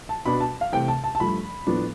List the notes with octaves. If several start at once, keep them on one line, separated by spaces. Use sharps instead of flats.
A5
B2 B3 D4 B5
A5
F5
C3 E3 A3 C4 G5
A5
A5
A5
G2 F3 A3 B5
A2 F3 B3 D4